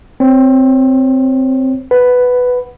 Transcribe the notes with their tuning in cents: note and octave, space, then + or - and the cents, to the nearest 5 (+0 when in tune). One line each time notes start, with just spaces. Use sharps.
C4 +0 C#5 +0
B4 +5 F#5 +0